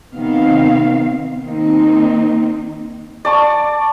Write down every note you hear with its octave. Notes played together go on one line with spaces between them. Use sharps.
C3 D#3 B3 C4 F5
D#3 A#3 C4 D#4
D5 A5 C#6